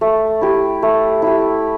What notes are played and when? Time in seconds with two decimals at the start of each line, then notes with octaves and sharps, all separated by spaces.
0.01 A3
0.41 E4 G4
0.82 A3
1.22 E4 G4